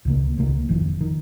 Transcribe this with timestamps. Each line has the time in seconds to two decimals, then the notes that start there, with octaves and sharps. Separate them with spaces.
0.05 C#2 C#3 A#3
0.38 C#2 C#3 A#3
0.69 F1 F2 D#3
1.01 D#3